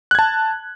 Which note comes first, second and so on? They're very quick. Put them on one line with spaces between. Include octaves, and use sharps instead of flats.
F#6 G#6 A5